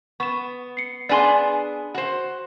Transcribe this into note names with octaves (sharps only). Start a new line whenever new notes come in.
B3 C#6 E7
C7 C#7
B3 D4 G#4 D5 G#5 C6
F#4 C5